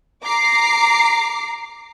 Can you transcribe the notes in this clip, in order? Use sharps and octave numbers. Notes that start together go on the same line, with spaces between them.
A#5 D6 C7